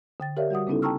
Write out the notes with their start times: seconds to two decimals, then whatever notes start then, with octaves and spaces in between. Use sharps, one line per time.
0.20 D3 G5 A6
0.37 G4 A#4 C#5 D5 E5 F5
0.50 G3 F#4 F#5 D#6
0.67 C#3 B3 C#4 D#4 E4 A4
0.82 G5 A5 A#5 C#6 E6 F6